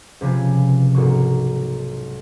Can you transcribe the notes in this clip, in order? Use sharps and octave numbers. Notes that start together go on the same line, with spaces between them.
C#2 C3 F3 C#4 B4 G#5
B1 G#2 A#3 F#4 C#6